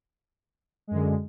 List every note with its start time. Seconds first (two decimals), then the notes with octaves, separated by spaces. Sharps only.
0.87 G#3
0.91 F#2
0.94 D3